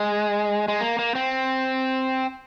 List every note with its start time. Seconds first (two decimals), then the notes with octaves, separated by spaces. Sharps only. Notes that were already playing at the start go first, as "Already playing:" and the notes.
Already playing: G#3
0.68 G#3
0.80 A#3
0.99 A#3
1.15 C4